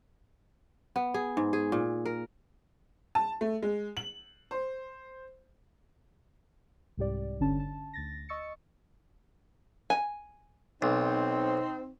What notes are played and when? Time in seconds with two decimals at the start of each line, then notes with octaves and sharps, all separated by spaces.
0.96 B3
1.14 G#4
1.37 G#2
1.53 G#4
1.72 A#2
2.05 A#4
3.15 A5
3.41 A3
3.63 G#3
3.97 F#7
4.51 C5
6.97 C2 G#2 G4 D5
7.40 G1 D3 C#4 A5
7.60 A5
7.93 D2 A6 A#6
8.29 D#5 C#6 E6 A6 C#7
9.90 G#5
10.82 B1 C4 D#4